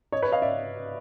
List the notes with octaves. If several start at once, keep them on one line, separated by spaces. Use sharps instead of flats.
C#5 D#5
B4 C#5
D#5 F5
D5 E5